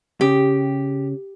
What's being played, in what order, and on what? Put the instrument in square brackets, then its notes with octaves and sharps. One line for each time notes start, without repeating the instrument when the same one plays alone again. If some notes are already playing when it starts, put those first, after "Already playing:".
[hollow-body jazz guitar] C#3 [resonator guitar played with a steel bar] G4